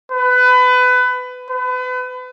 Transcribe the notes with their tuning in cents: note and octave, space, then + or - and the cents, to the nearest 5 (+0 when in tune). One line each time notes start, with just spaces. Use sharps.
B4 +25
B4 +35